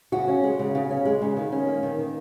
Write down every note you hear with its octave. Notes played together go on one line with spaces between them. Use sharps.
C#3 F#4
C#4
G#3
C#3
C#3
C#4
G#3
C#3
D#3
C#4
A#3
D#3
D#3